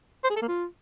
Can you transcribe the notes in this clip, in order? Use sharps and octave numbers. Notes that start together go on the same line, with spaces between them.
C5
G#4
A4
A#3
F4